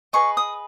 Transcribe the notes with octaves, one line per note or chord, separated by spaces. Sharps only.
G#4 B4 D#5 C#6
D#6